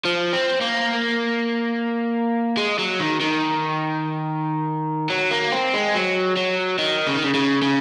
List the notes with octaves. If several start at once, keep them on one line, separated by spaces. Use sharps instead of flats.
F3
C4
A#3
G#3
F#3
D#3
D#3
F#3
A#3
C4
G#3
F#3
F#3
D#3
C#3
D#3
C#3
C#3
C#3